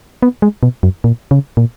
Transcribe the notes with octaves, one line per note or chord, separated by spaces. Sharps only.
B3
G#3
B2
F#2
A#2
C#3
A#2